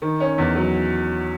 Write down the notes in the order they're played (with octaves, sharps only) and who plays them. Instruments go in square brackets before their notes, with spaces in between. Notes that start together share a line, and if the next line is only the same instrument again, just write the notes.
[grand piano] D#3
C#4
E2
F#3